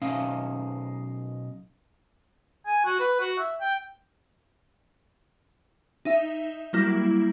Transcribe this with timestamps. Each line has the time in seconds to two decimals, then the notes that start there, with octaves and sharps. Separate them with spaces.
0.01 B1 C#4 D#4 F5
2.67 G#5
2.85 F#4
3.00 B4
3.20 F#4
3.39 E5
3.61 G5
6.05 D#4 E5
6.73 F#3 G3 A#3 E4